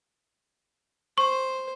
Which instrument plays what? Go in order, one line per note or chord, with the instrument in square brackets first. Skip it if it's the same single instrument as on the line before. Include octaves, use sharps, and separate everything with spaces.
[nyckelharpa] C5 [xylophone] C#6